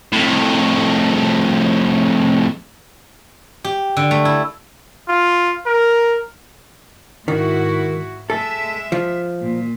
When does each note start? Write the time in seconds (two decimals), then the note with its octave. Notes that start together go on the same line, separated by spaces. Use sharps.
0.13 F2 A2
3.64 G4
3.97 D3
4.11 A3
4.25 E4
5.09 F4
5.66 A#4
7.28 G#2 D#3 E4 F#4
8.30 G#3 A4 E5
8.92 F3
9.42 A#2